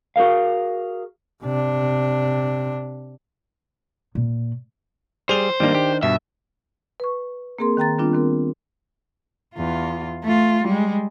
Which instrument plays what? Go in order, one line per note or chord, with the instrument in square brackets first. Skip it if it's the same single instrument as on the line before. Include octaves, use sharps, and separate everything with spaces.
[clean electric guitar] F#4 G#4 A#4 F5
[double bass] C3 D4
[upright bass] A#2
[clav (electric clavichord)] G3 G#4 [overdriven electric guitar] C5 [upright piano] F7 G7
[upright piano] D#3 D4 [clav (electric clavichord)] G3 A#3
[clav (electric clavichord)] G4
[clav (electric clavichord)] G2 B2 [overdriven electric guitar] E5
[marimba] B4 C#6
A#3 C4 G#4 A#4 C6
D#3 G5 A#5 A6
D#3 G3 B3 C4 D4 F4
D#3 C4 A#4
[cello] E2 F4
A3 F4
G3 G#3